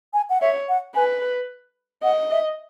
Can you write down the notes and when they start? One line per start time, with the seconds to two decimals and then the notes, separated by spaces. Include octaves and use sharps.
0.14 G#5
0.30 F#5
0.41 C#5 E5
0.69 F#5
0.95 B4 G#5
2.03 D#5 F#5
2.31 E5